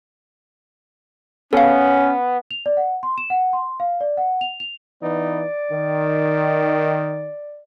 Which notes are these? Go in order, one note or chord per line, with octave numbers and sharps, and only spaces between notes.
B3 C#4 A4 F5
F7
D5
F#5
C6
E7
F#5
C6
F5
D5
F#5
F7
F7
E3 B3 D#4 D5
D#3